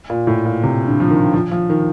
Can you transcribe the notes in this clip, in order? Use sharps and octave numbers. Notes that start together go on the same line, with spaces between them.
A#2
A2
A#2
C3
D3
F3
D#3
F3
F3
D#3